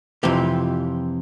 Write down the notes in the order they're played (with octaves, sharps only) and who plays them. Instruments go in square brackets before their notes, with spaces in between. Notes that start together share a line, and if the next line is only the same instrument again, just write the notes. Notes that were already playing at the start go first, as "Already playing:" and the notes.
[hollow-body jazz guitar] F2 C3 E3 G4